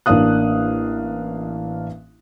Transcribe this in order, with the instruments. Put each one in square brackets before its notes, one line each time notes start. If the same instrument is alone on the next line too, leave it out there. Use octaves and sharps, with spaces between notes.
[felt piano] A1 A#3 D4 F5 D#6 F#6